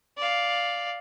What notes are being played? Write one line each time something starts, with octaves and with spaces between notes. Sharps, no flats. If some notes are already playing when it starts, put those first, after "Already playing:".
D5 F5